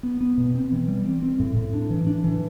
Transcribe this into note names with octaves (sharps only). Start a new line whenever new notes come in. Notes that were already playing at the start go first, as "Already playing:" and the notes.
B3
B3
B2
C4
E3
G3
C4
C4
A2
A2
D4
E3
D4
E3